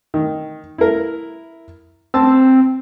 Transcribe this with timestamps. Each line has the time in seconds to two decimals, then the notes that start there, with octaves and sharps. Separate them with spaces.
0.14 D#3
0.78 E4 A#4
2.14 C4 A5 E6